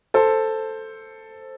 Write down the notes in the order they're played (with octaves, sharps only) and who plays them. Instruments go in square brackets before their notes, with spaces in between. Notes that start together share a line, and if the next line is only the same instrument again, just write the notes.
[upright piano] A4 C5